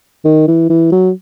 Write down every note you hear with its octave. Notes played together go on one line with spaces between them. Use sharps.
D#3
E3
E3
F#3